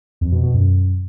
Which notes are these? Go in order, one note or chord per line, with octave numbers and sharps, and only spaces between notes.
F2
B2
B2
F#2